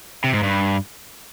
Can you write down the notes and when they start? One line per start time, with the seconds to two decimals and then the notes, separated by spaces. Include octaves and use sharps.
0.24 C3
0.34 G#2
0.43 G2